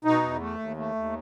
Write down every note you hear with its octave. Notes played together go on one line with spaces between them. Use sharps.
B2 D#4
E2
A3
D#2
A3
D#2